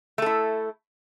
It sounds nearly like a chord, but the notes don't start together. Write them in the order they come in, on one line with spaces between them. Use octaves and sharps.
A3 A4 E4